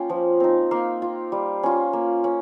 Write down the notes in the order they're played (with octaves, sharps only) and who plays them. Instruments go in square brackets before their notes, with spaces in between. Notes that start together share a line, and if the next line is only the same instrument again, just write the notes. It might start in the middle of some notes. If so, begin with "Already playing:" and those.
Already playing: [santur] A#3 C#4 F4 G5
F3
C4 D#4
A#3 F5
F4
G3
C#4 F4
A#3
C#4